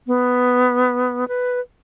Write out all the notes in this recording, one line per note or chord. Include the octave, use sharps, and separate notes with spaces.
B3
B4